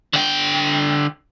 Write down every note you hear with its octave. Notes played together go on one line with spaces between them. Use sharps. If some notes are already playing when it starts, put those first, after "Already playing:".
D3 G5